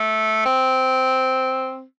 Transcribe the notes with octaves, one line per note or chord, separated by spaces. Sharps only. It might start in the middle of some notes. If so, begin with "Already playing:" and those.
Already playing: A3
C4